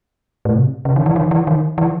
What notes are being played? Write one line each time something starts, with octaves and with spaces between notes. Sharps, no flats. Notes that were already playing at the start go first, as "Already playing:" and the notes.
A2
C3
C#3
D#3
E3
D#3
E3
D#3
E3